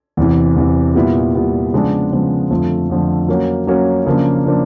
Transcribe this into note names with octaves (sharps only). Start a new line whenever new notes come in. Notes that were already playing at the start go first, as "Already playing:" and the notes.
E2 C3 E3
E2 C3 E3
A#2 G3 B3 E4
A#2 G3 B3 E4
C#3 F3 G#3 B3 D4
C#3 F3 G#3 B3 D4
F2 D3 F3 A3
F2 D3 F3 A3
F#3 A#3 C#4 F#4
F#3 A#3 C#4 F#4
C#3 F3 A#3 D4
C#3 F3 A#3 D4